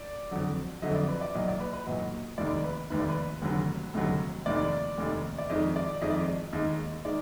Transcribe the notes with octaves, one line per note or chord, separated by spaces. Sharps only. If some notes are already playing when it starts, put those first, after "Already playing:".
Already playing: D5
F2 D3 F#3
F2 D3 F#3 D#5
D5
B4
D5
B1 A#2 F#3 D#5
D5
B4
B4
B1 A#2 F#3 D#5
F1 D#2 D#3 D5
B4
F1 D#2 D#3 B4
D5
B4
F1 D#2 D3 F#3
F1 D#2 D3 F#3
F1 D#2 D#3 D5
F1 D#2 D#3
D5
F2 D#3 G#3 D#5
D5
F2 D#3 G#3 D#5
D5
D#5
D#2 D#3 G#3
D#3 G#3 D5